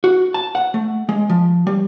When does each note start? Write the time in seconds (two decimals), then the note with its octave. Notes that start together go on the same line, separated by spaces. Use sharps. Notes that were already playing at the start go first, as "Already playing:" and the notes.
0.04 F#4
0.34 A5
0.55 F#5
0.74 A3
1.09 G#3
1.29 F3
1.67 G3